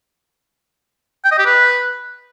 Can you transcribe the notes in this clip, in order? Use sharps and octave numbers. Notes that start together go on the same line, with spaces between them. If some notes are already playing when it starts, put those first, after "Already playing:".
G5
D#5
G4
B4